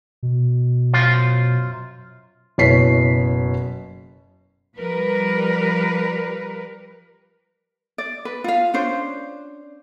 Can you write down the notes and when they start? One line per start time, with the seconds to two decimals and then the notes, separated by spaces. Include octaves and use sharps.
0.23 B2
0.93 F#2 F4 C5
2.58 F#1 B2 E4 C#5 B6 C7
4.78 F3 G3 A#4 B4
7.98 D5
8.25 B4
8.44 F4 F5
8.74 C#4 D4 C5